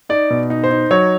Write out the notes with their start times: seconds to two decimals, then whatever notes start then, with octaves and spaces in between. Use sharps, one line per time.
0.09 D#4 D5
0.30 B2
0.50 D#4
0.64 C5
0.71 D#4
0.91 F#3 C#5